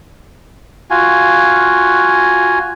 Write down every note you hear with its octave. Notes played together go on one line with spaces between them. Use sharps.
F4 F#4 G#5